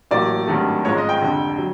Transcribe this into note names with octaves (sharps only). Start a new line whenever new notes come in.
A1 A2 F#3 A#3 D5
G#1 G2 D#3 F#3 A3
G#2 F3 G#3 C#4 C#5
D#5
G5
F1 F2 D3
F#3